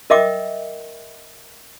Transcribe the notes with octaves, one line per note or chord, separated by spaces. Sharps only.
A#4 D#5 E5 G5 D6 D#6